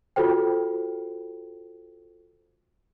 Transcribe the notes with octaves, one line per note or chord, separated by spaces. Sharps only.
F4 F#4 A4 C5 G5